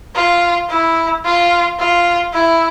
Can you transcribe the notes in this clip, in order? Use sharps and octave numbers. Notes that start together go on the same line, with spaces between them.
F4
E4
F4
F4
E4